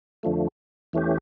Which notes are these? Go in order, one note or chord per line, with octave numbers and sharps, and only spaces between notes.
F2 D3 F3 A3
E2 E3 A3 C#4 G4